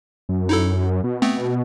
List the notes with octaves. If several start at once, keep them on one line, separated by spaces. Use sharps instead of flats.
F#2
D#4 E4 A4
B2
A3 B3 C4